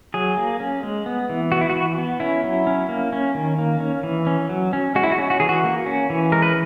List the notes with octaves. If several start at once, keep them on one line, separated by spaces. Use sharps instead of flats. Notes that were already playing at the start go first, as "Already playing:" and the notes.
F#3 G#4
A#3
C#4
G#3
B3
E3
B3 F#4
E4
E3 F#4
B3
C#4 E4
F#3
C#4
A#3
C#4
D#3
A#3
C#4
E3
C#4
F#3
C#4
G#3 F#4
E4
F#4
C#4
F#4
E3 G#4
F#4
A#3
C#4
E3
G#3 A#4
B4